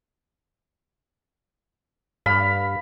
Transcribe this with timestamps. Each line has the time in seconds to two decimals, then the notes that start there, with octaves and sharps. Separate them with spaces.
2.26 G2 F5 B5